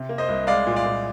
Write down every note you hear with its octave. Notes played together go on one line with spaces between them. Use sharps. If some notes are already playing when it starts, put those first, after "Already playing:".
Already playing: C3
A#3
C5 D#5
C2
G#3 D5 F5
A#2
D5 F5
A#2